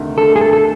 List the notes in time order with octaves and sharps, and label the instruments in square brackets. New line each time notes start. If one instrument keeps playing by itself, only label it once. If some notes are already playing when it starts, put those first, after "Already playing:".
Already playing: [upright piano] D2 C3 D#3
[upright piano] D2 [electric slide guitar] A4
[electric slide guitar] G#4
A4
A4